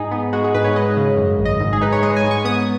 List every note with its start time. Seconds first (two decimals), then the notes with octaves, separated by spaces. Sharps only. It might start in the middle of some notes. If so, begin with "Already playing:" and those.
Already playing: G#2 D#4 G#4
0.11 B3
0.33 G#3 F#4
0.44 G#4
0.54 G#2 B4
0.64 C#5
0.75 G#3 D#5
0.97 C#3
1.17 F#2
1.38 G#1
1.45 D#5
1.60 G#2
1.73 G#4
1.81 D#4 B4
1.92 C#5
2.02 G#3 D#5
2.16 G#5
2.24 G#2
2.31 C#6
2.45 B3 D#6